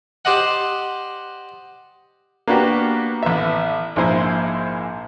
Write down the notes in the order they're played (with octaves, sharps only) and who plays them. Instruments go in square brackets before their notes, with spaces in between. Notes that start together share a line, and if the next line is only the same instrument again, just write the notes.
[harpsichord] G4 C5 D5 D#5 F#5
[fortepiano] A#3 B3 D4 F#4 G4 B4
A1 B3 E5
A#1 G#2 A#3 E4 C5 G#5